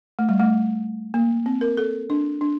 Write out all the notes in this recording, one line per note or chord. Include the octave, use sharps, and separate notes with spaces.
A3
G3
A3
A#3
C4
A#4
A4
D4
D4